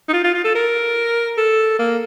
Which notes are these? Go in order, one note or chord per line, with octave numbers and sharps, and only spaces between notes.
D#4
F4
F4
F4
A4
A#4
A4
A#3